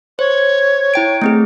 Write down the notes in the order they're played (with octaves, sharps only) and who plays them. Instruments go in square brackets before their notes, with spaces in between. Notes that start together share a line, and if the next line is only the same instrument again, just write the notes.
[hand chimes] C5 [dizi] C#5
[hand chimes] E4 G5 D7
A3 C4 G#4